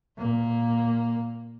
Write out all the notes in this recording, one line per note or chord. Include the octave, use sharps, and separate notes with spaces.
A#2 A#3